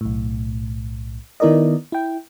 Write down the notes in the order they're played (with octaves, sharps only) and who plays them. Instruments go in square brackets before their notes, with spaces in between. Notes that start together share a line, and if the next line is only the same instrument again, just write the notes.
[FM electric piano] B1 A2
D#3 B3 E4 A#4 D5 D#5
E4 G5